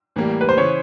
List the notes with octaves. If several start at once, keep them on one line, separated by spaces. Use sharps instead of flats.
A2 E3 G3 A#3
B4
C5
C#3 E3 C#5